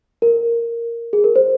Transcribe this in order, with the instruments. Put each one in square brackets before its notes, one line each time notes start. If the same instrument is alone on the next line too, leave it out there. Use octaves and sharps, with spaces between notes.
[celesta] A#4
G#4
A#4
C5